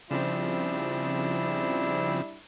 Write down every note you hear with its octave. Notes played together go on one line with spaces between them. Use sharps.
C#3 F3 G3 C4 D4 E4